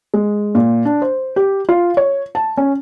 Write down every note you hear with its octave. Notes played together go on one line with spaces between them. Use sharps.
G#3
A#2
D4
C5
G4
F4
C#5
A5
C#4